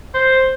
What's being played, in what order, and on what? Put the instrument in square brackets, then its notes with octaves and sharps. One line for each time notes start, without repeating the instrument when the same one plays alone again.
[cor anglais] C5